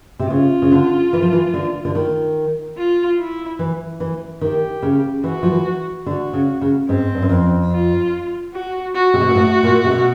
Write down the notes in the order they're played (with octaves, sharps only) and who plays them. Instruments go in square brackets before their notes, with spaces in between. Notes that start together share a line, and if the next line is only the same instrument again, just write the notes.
[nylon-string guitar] C3
[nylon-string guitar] C#3 [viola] F4
[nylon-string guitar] C#3
D3
E3
F3
E3
D3
D3
D#3
[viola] F4
E4
[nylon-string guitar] E3
E3
[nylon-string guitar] D#3 [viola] G4
[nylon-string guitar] C#3
[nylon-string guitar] E3 [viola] F#4
[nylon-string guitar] F3
E3
[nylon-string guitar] D3 [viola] F#4
[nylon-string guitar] C#3
C#3
[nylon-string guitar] G#2 [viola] C4
[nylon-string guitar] G2
F#2
F2
[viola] F4
F#4
F#4
[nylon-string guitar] C3
B2
A#2
A2
A#2
C3
B2